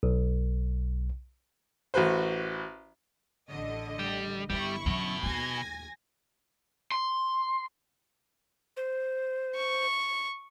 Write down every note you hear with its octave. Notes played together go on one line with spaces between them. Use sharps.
B1
A1 F#4 B4 C5
A1 D3 D#5
G3
G1 D#3 G3 B3 E4 C#6
B2 F#3 C#4
D#2 A#3 G#5 G#6 A#6
C6
C5
C#6